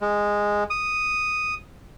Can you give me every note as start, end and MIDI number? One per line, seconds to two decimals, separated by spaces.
0.01 0.64 56
0.70 1.54 87